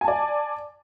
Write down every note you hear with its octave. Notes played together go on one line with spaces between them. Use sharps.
D5 G#5 A5